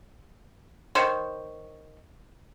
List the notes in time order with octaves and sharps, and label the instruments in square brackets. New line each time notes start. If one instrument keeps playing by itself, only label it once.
[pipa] D#3 C5 C#5